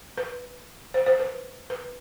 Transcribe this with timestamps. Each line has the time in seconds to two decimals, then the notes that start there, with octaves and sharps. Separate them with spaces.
0.17 B4
0.94 C5
1.06 C5
1.20 B4
1.70 B4